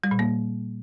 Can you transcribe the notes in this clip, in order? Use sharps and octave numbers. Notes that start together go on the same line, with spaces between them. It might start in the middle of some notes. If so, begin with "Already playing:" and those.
G3
A#2
A#3